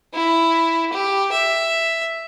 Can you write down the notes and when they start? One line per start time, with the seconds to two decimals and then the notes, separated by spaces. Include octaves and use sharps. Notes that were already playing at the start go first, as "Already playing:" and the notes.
0.14 E4
0.93 G4
1.32 E5